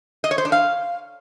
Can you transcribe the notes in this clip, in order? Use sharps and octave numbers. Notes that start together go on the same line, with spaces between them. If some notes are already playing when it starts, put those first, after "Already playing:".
D#5
C#5
C5
D4
F5